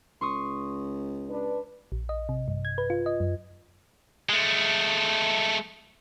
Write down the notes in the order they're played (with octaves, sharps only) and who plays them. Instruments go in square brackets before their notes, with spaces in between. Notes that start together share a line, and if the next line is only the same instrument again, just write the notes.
[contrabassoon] C#2 [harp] C6 C#6 D#6
[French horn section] D4 B4
[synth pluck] A#1
D#5
C3
G2
G#6
B4
F4
D#5
F#2
[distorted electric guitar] G#3 A3